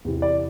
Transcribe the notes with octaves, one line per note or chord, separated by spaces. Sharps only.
E2 C3 E3
D5